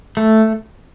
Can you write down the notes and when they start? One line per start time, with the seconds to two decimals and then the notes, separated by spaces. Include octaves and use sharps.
0.17 A3